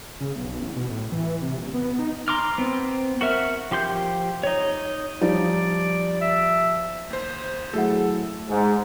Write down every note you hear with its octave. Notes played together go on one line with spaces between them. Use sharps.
C#3
B1
A1
B2
A2
E3
C3
D#1
B3
D#4
A#5 C6 D6 F6
B3 C4
F#4 A#4 E5 F6
F3 G4 C6 G6
D#4 C#5
F3 G3 D#4 D5
E5
D#2 C5
F#3 A3 E4 G#4 A4 F#5
G#2